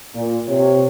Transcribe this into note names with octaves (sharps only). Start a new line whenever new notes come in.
A#2
C3 C#5